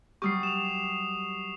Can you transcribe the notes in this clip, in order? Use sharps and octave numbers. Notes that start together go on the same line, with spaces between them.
F#3 G3 G4 C#6 D#6 C7
E7 F7